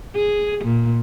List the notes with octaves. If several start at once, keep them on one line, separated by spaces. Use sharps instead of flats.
G#4
A#2